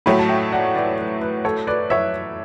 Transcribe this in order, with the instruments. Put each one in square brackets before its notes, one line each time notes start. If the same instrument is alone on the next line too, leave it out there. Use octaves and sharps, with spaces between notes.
[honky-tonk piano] A2 F#3 A3 [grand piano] G5 B5
[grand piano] A5
E5 G5
D5 F#5
B4 D5
B4
B4
A4 C#5
B4 D5
C#5 E5